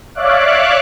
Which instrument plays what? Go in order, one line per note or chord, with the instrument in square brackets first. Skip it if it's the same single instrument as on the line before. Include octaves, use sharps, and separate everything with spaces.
[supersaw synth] C#5 D5 E5 F5 D6 F#6